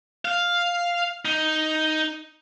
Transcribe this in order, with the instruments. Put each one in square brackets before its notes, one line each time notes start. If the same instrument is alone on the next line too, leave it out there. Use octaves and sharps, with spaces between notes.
[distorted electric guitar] F5
D#4